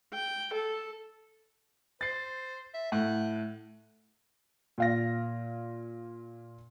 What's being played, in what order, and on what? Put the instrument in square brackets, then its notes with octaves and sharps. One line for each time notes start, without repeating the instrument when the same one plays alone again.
[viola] G5
A4
[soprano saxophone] C5 [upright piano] A6 C7
[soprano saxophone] E5
[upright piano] A2 [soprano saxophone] F#5
[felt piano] A#2 F5 A#6